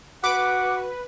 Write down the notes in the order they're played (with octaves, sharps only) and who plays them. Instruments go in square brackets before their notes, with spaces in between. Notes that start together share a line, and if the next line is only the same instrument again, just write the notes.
[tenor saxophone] F#4 [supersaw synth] B4 [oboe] F#5 [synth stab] D6